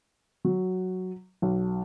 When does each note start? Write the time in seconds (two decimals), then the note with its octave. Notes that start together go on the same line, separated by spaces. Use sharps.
0.45 F#3
1.42 B1